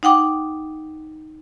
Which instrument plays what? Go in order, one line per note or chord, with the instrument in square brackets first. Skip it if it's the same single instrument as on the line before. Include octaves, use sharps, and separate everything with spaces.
[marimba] D#4 F#5 G5 D6